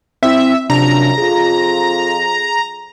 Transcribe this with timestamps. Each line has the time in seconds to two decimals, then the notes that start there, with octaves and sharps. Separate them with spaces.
0.23 C4 E4 E5
0.70 F#2 C3 F3 D4 A#5
1.18 F2 F4 G#4